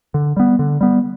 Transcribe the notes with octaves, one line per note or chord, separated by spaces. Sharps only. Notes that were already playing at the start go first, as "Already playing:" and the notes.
D3
G3 B3
D3
G3 B3